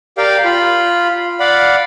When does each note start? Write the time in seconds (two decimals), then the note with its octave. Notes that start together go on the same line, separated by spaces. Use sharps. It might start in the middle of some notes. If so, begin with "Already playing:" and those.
0.18 G4 A#4 D5 F5 G5
0.45 F4 B5
1.40 D5 F5 F#5 B5